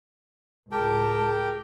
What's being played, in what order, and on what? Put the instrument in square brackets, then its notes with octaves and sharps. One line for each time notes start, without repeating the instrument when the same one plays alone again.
[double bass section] C#2 A2 [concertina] G4 A#4 G5 [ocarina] G#4 [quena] A5